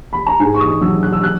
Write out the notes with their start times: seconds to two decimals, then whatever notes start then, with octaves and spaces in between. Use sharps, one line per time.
0.13 B5
0.27 A#5
0.40 G#2 G#5
0.54 C#6
0.60 D#6
0.81 F#3 E6
1.03 F#6
1.13 E6
1.24 F#6